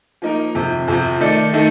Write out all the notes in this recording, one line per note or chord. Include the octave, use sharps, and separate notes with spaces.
F3 A#3 D#4 A#4
F2 C3 F3
F2 C3 F3
D#3 A3 D#4 A4 D5
D#3 A3 D#4 A4